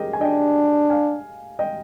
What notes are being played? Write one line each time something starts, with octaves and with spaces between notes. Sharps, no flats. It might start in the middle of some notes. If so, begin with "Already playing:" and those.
Already playing: G4 G#4 A#4 D#5 G5
G#5
D4 D#5 G5
F5 G#5
D#5 G5